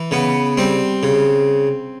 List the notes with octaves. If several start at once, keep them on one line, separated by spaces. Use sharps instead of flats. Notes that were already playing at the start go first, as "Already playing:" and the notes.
Already playing: E3
C#3 B3
G3 C4
C#3